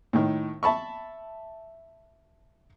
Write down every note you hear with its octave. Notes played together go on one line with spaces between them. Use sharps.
A2 D#3
E5 A5 B5 C#6